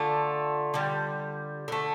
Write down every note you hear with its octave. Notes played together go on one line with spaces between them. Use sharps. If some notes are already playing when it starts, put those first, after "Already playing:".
Already playing: D3 A3 F4
D3 G3
D3 A3